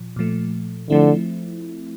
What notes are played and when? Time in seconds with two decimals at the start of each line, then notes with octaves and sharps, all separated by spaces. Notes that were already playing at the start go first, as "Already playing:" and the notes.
Already playing: A#2 F3
0.16 A#2 F3 A3
0.90 D3 F3 A3 C4 E4